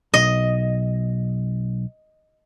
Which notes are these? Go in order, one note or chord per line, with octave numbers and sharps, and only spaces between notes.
B1 D#5